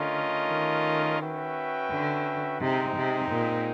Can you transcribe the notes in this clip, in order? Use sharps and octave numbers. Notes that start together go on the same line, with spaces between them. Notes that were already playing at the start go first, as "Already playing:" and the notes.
Already playing: D3 A3 C#4 F4 A#4 D#5
D#3
C#4 F#4 B4 E5 G5
D3
C3 G#3 C4 D#4
C3
A#2